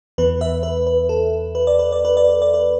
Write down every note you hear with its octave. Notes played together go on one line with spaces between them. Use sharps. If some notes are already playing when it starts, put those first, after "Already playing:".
E2 E3 B3 B4
B4 E5
B4
B4
A4
B4
D5
B4
D5
B4
D5
B4
D5
B4